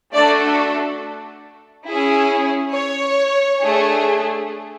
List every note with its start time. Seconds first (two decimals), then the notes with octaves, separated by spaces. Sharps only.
0.13 A3 D4 F#4 A4 D5
1.87 C#4 E4 G#4
2.74 C#5
3.60 A3 D4 G#4